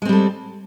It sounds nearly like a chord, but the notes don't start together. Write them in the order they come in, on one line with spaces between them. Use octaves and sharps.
G#3 C4 G3 A4